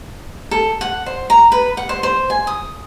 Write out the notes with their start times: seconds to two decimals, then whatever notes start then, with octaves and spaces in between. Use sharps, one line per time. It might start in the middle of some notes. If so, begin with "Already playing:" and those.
0.51 A4
0.81 F#5
1.06 C5
1.30 A#5
1.52 B4
1.77 F#5
1.89 C5
2.03 C5
2.30 G#5
2.47 D#6